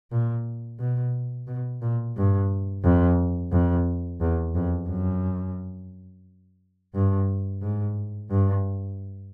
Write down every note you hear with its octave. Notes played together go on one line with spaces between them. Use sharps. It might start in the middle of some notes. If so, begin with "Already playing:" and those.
A#2
B2
B2
A#2
G2
F2
F2
E2
F2
F#2
G2
G#2
G2